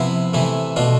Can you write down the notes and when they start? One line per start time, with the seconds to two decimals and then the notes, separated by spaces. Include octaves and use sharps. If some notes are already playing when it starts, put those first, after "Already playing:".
Already playing: C3 F3 B3 E4
0.33 C3 E3 A3 E4
0.76 B2 A3 D4 F4